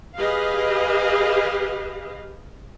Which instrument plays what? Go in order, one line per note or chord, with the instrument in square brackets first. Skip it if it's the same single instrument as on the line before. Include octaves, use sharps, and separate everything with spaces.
[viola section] G4 G#4 B4 D#5 F5